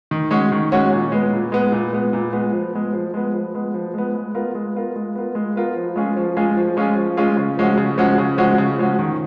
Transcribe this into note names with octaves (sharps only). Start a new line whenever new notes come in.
D#3
G#3 C#4 F#4 C#5
D#3
G#3 C#4 F#4 C#5
A#2
G#3 B3
A#2
G#3 B3
A#2
G#3 B3
A#2
G#3 B3
F3
G#3 B3
F3
G#3 B3
F3
G#3 B3
F3
G#3 B3
G#3
B3 F4 A#4
G#3
B3 F4 A#4
G#3
B3 F4 A#4
G#3
B3 F4 A#4
F3
G#3 C#4 F4 G#4
F3
G#3 C#4 F4 G#4
F3
G#3 C#4 F4 G#4
F3
G#3 C#4 F4 G#4
C#3
F3 G#3 C#4 F#4
C#3
F3 G#3 C#4 F#4
C#3
F3 G#3 C#4 F#4
C#3
F3 G#3 C#4 F#4
D#3